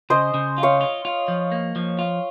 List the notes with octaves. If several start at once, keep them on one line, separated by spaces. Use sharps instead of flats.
C#3 C5 D#5
C#3
F4
C#5 F5
F4
F4
F3
A#3
F3
F4